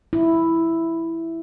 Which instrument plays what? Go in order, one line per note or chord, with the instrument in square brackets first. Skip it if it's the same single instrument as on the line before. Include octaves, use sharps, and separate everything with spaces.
[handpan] E4